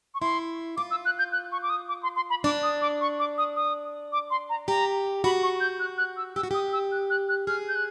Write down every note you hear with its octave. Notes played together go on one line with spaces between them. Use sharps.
C#6
E4 C6
F4 D6
E6
F#6
G6
F#6
C#6
D6
D#6
D6
C6
C6
B5
D4 D6
D#6
D6
C#6
D6
D#6
D#6
D6
C6
A#5
G4 A#5
F#4 B5
C#6
G6
F#6
F#6
E6
G4 E6
F#4
G4 D#6
E6
F#6
F#6
F#6
G#4 F6
G6
F#6